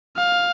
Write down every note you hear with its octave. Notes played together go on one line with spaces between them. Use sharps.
F5